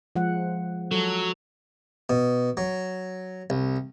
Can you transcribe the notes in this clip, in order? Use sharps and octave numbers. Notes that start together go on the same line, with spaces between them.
F3 G#3 F#5
F#3 A4
B2
F#3
C2